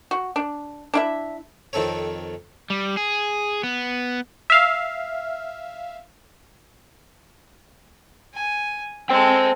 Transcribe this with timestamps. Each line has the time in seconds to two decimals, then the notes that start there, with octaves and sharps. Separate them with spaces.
0.11 F#4
0.36 D4
0.94 D4 E4 E5
1.73 F2 D#3 C4 A4 C#5
2.70 G3
2.97 G#4
3.63 B3
4.50 E5 F5
8.34 G#5
9.10 G#3 A4 C5 G5